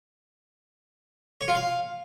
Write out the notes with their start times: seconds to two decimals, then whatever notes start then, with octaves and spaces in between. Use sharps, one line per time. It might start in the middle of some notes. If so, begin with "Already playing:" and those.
1.41 C#5
1.48 F4
1.55 F5